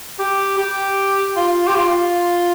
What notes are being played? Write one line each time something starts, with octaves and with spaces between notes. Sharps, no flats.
G4
G4
F4
G4
F4